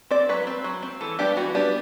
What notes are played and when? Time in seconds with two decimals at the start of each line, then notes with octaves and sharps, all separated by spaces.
0.11 C4 D5
0.29 F#3 B4
0.47 C4
0.64 F#3
0.83 C4
1.01 E3 A4
1.19 G3 B3 D4 G4
1.37 E3 F#4
1.55 G3 B3 D4